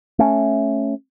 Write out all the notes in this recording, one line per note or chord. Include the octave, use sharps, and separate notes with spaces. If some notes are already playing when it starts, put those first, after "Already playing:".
A3 C#4